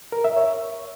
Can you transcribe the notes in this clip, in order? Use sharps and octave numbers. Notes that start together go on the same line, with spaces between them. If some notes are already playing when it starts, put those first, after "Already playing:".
A#4
E5
C#5